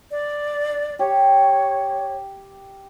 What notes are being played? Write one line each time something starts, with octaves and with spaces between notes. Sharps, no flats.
D5
G4 C#5